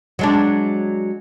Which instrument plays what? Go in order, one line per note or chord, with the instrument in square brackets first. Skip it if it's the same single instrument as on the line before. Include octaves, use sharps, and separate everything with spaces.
[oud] F#3 G#3 D4